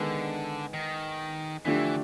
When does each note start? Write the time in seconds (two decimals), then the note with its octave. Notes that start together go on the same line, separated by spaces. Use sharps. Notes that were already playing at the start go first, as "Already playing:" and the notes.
Already playing: D3 D#3 G#3 B3
0.74 D#3
1.65 D3 E3 F3 A3 D4 G4